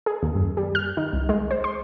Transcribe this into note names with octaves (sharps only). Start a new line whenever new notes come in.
G#4
D#2
F#2
G3
F6
D#3
C2
G#3
C5
C6